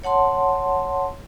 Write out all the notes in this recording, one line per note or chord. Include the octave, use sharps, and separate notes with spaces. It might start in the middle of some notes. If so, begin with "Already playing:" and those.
C#5 F#5 A5 C6